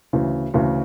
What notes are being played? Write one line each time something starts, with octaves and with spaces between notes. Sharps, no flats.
D2 C#3 E3
D2 C#3 E3